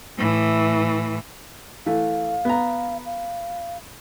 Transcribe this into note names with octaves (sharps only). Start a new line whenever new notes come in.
A2 E3
E3 A3 F5
B3 A#5
F5